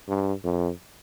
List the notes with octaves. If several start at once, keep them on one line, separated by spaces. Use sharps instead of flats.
G2
F2